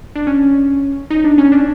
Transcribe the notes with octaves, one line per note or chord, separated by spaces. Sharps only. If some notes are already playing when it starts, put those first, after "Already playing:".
D4
C#4
D#4
D4
C#4
D4